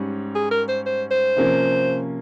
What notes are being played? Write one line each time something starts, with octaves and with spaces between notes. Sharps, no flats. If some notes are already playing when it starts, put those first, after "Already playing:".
Already playing: G#2 G3 C#4
G#4
A#4
C5
C5
C5
C3 F3 A#3 C#4